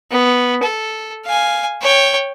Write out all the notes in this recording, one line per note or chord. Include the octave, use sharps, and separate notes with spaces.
B3
A4
F5 G#5
C#5 G5